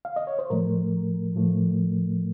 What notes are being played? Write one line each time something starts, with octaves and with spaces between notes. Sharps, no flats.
F5
D#5
C#5
C5
A2 F3 A3 A#4
A2 F3 A3